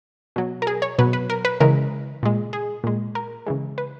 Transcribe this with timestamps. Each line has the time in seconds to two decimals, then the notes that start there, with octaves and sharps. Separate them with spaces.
0.36 B2 F#3
0.62 A#4
0.67 G#4
0.82 C#5
0.99 B2 F#3 B4
1.13 B4
1.30 A#4
1.45 B4
1.60 C#3 E3 G#3 A#4
2.23 A#2 G#3
2.53 G#4
2.84 A#2 G#3
3.15 A#4
3.47 C#3 E3 G#3
3.78 B4